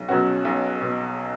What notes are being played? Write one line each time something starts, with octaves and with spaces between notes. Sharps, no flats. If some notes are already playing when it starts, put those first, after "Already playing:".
Already playing: B1
B2 F#3 C#4 F#4
B1
B2